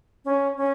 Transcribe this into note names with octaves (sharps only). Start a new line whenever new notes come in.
C#4
C#4